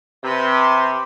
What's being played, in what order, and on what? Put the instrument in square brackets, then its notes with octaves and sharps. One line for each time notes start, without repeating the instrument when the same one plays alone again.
[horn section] C3 [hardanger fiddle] B4 C6